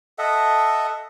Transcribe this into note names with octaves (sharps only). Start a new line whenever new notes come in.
A4 D#5 E5 F#5